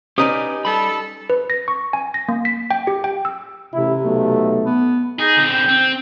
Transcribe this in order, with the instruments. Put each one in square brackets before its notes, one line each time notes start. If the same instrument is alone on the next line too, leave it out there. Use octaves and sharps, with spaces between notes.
[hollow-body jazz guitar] C#4 D#4 D5 [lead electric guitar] G4 B4 [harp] D#6
[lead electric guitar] G3 B5 [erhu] A4
[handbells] B4
A#6
C#6
G#5
A#6
A#3
B6
G5
G4
G5
E6
[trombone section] A1 E4 [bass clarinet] C3
[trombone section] B1 A3
[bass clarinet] B3
[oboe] D#4 [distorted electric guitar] G#4
[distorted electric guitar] D3 C4
[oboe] G5
[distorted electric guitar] C4